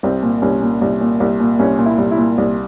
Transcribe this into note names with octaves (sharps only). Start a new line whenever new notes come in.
C2 C4
A#2
C2 C#4
A#2
C2
A#2
C2
A#2
C2 C#4
A#2
E4
C2
E4
A#2
C2